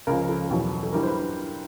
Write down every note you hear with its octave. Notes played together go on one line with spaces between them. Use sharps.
C#2 C#3 F3 A#4
A4
E2 B2 F#3
A4
G2 E3 G3 A#4
C5
B4